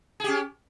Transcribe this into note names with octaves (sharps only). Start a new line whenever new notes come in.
C#4 G4 G#4